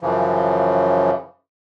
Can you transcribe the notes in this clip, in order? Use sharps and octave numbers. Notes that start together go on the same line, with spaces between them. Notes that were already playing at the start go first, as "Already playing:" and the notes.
F#2 C#3 E3 F3